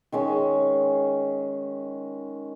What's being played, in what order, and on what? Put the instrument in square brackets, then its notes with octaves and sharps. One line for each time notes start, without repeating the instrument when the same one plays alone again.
[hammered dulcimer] D#3 G#3 C#4 D#5